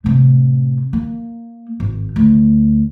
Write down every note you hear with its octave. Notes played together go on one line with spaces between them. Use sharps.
A2 C3
A#3
G#1
D2